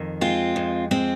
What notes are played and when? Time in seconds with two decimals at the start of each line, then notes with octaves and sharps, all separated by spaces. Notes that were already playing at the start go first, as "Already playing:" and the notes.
Already playing: F2 D#3
0.21 G#3 C4 F4
0.56 F2
0.91 G#3 C4